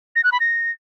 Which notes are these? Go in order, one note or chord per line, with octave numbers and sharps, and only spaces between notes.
A#6
F#6
B5
A#6